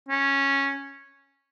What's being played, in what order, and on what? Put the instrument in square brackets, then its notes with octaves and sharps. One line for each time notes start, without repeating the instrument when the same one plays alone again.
[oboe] C#4